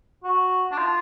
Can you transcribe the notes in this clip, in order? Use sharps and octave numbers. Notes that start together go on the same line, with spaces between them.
F#4
D4
F4